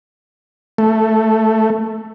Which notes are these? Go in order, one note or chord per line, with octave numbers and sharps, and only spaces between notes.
A3